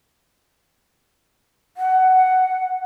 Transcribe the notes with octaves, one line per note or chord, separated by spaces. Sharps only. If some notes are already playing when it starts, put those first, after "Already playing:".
F#5